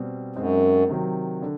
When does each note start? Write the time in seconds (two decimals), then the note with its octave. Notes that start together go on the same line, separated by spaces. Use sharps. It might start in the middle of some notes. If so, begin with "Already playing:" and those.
Already playing: B2 G3 C4
0.36 F#2 G#3 C4 D#4
0.89 C3 D#3 F#3
1.42 D3